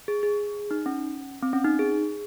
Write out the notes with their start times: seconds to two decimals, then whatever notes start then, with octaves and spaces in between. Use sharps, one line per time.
0.08 G#4
0.23 G#4
0.71 D#4
0.86 C#4
1.42 C4
1.53 C#4
1.64 D#4
1.79 G#4